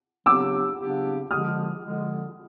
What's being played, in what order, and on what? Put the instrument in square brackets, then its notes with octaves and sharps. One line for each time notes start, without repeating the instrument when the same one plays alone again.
[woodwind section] C#3 F#3 B3 D4 G4 [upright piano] D6 E6
[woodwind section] C#3 F#3 B3 D4 G4
[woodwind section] D3 F3 G#3 [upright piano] D#6 F6
[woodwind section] D3 F3 G#3